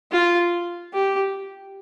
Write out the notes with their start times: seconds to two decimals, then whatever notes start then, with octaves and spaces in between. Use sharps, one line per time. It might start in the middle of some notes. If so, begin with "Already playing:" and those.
0.12 F4
0.93 G4